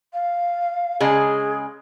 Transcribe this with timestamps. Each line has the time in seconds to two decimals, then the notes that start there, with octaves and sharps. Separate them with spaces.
0.13 F5
1.00 C#3 G#3 G#4